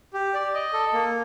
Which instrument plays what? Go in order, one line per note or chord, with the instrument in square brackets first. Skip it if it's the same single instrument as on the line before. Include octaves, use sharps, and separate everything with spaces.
[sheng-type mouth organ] G4
D5
D#5
A4
A#3